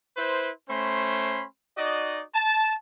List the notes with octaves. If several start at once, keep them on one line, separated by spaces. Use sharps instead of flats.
E4 B4 C5
A3 C#4 C5 B5 C6
D#4 F#4 D5 D#5
A5